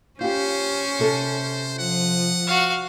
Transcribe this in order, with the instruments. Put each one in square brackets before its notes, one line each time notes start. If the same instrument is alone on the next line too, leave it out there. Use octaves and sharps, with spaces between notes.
[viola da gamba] C#4 [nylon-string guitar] F4 G4 [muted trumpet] C5
[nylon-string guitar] C3 A4
[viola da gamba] F3 [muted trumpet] F#5
[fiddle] F#4 F5